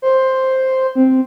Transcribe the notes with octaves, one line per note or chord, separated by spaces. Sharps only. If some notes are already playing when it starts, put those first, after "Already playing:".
C5
C4